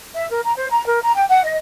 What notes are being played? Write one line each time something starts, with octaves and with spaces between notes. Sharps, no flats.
E5
A#4
A#5
C5
A#5
A#4
A#5
G5
F#5
D#5